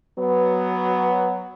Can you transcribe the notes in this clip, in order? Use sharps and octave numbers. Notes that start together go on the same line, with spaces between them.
F#3 B3